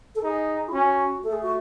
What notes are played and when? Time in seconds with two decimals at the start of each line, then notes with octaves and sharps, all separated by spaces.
0.15 A4
0.23 D#4 G#4
0.69 E4
0.73 C#4 F#4
1.23 A3 A4
1.32 G#4
1.43 F#4